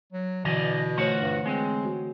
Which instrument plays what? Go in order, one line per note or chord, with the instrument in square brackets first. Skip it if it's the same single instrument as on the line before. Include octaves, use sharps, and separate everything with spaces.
[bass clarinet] F#3
[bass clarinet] B2 [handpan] D3 E3 [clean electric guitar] D5 D#5 G#5
[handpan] A3 C5 C#5 [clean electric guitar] F4 F#4 F#5
[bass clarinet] G2
[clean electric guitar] G#3 [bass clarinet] C4
[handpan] F#4